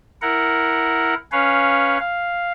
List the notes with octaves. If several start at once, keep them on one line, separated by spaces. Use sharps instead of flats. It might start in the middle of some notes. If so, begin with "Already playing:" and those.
E4 A#4 F#5
C#4 B4 C#5 F5
F5